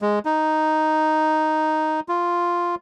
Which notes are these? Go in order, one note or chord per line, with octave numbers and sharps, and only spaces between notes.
G#3
D#4
F4